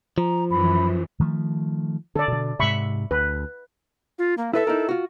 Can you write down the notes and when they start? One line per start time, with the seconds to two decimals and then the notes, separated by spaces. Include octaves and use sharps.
0.18 F3 A#5
0.50 F#2 E3 B5
1.20 D#3 F3 A3
2.16 D3 A4 D5
2.28 B2 D3
2.59 G#2 C3 E5 B5 C#6
3.11 D2 B4
4.19 F4
4.38 A#3
4.53 E4 A4 B4 E5
4.67 D#4 E4 A#4
4.89 F4 F#4